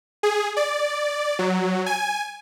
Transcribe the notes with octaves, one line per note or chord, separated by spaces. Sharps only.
G#4
D5
F#3
G#5